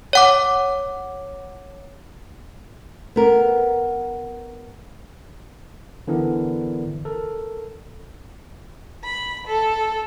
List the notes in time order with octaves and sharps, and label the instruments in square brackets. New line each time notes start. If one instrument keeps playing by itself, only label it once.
[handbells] C#5 F#5 D6
[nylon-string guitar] B3 A#4
[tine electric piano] D3 E3 B3 D4 E4 A#4
A4 A#4
[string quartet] B5
A4